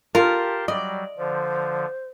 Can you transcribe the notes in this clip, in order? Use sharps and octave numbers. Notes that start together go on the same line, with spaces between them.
F4 G4 A#4 A5 C6
F#3 G3 D5 D#5
D3 F3 C5